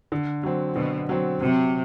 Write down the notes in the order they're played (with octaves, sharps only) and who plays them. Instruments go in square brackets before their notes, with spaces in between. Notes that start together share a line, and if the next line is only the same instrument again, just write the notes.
[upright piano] D3
F#3 C4
[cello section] B2 [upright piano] D3
[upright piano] F#3 C4
[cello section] C3 [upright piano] F#3